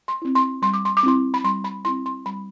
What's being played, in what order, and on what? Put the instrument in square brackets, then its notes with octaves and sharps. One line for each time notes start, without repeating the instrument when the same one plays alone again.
[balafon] C6
C4 E4
C6
G3 C6
D6
C6
D6
C4 E4 C6
B5
G3 C6
B5
C4 E4 C6
C6
G3 B5